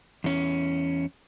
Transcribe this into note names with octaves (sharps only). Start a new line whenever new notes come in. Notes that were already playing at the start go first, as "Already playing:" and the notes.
E2 C#4